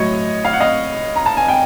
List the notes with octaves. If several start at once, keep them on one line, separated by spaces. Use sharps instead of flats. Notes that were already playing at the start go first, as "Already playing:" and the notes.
Already playing: A2 F#3 C#5 D#5
F5
F#5
D#5 F5
A#5
A5
G#5
G5